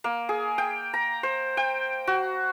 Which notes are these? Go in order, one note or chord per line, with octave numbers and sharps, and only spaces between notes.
A#3
G#4
G5
A#5
C5
G5
F#4